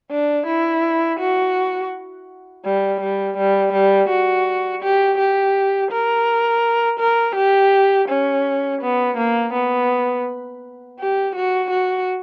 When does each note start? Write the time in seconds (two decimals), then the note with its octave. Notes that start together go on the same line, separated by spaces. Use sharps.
0.11 D4
0.47 E4
1.19 F#4
2.65 G3
3.01 G3
3.37 G3
3.73 G3
4.09 F#4
4.82 G4
5.18 G4
5.91 A#4
7.00 A#4
7.36 G4
8.09 C#4
8.81 B3
9.18 A#3
9.53 B3
10.99 G4
11.36 F#4
11.71 F#4